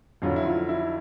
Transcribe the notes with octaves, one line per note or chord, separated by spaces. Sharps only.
F2 D3 F#3 F4
E4
F4
E4